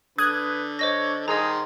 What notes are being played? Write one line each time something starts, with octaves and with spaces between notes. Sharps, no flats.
D3 B4 D#6 F#6 G#6
C5 C#5 D#5 A#6
D#3 G#4 D#5 A#5 C6